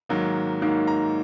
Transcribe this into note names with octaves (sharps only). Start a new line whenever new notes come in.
G#2 D#3 F#3 A#3
G#2 D#3 F#3 A#3
A#5